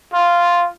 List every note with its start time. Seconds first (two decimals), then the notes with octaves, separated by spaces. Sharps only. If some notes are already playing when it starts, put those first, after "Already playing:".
0.13 F4